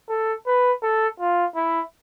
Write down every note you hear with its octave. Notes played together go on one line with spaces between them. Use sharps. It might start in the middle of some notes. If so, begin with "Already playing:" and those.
A4
B4
A4
F4
E4